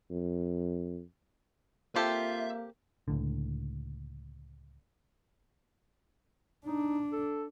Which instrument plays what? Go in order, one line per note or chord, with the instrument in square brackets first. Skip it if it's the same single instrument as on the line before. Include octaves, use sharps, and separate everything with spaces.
[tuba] F2
[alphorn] A#3 [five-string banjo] C4 G4 A4 [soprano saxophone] F4 [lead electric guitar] E5
[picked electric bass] C#2 A2 D3
[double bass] D4 [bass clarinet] D#4
[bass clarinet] A4